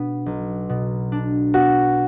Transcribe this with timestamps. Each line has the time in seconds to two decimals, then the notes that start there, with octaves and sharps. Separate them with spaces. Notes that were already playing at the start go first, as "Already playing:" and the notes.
Already playing: B2 B3 D4
0.26 B1
0.69 B2
1.12 D4
1.54 B3 F#4